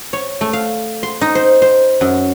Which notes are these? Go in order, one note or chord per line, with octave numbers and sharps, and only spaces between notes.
C#5
A3
F5
C6
D#4
C5
C5
F#2